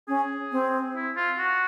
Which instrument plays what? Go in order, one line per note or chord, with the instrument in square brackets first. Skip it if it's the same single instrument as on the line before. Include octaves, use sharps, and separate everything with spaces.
[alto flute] C#4 [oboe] G#4
[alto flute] C4
[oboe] E4
F4
F#4